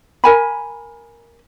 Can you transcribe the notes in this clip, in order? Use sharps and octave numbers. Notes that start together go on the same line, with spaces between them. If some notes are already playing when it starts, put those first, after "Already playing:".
A#4 G#5 B5